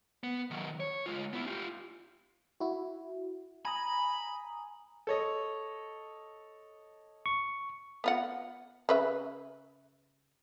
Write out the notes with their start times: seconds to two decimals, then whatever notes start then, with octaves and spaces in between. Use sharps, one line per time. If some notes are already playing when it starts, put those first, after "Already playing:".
0.23 B3
0.51 D#3 F#3
0.80 C#5
1.06 G#3 F4
1.33 B3 E4
1.46 F4 G4
2.60 E4 F#4
3.65 G#5 A#5 B5 D#6
5.07 A4 C#5 D#5
7.26 C#6
8.04 B3 F4 F#5
8.89 C#3 B4 E5